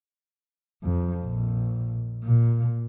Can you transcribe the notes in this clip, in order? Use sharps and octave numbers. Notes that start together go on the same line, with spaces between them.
F2
A#1
A#2